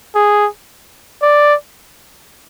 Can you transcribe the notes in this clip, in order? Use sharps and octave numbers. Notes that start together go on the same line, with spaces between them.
G#4
D5